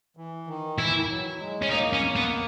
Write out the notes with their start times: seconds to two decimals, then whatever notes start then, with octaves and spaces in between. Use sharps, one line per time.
0.17 E3
0.47 D#3
0.78 E3 E4
1.09 F#3
1.40 G#3
1.62 C#4
1.70 A#3 D#4
1.93 C#4
2.16 B3